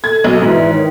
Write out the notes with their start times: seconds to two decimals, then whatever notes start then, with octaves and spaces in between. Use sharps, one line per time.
0.04 A4 G#6
0.24 B1 D#5
0.42 G#2 E3 F#4
0.56 D5
0.73 D#3 C#5